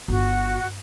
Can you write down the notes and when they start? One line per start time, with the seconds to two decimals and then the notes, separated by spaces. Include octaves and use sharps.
0.08 G1 F#4